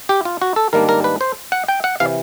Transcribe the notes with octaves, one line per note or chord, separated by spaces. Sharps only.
G4
F4
F#4
A4
G#2 D#3 G3 A#3 D4 A#4
A#4
B4
C5
F#5
G5
F#5
C3 E3 F5